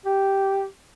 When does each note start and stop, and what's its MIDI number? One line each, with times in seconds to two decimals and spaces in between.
0.05 0.64 67